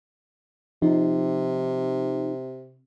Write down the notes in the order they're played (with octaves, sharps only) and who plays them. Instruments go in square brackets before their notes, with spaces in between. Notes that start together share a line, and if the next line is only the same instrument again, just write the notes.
[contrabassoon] C3 [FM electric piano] F3 D#4